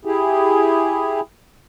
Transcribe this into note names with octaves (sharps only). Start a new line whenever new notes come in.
E4 G4 G#4